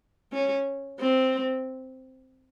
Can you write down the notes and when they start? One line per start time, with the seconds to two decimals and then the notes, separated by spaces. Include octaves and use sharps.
0.32 C#4
1.00 C4